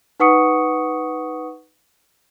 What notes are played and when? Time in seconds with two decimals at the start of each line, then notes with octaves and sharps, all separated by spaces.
0.20 D#4 B4 F#5 C#6 D#6 C#7